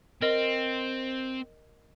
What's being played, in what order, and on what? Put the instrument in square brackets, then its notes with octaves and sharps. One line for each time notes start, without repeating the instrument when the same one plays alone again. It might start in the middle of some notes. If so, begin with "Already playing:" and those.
[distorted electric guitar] C4 [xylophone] A#4 D#5